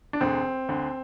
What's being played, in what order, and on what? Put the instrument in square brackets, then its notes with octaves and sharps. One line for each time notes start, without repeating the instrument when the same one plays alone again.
[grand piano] D4
E1 D2 D3 C4
D2 D3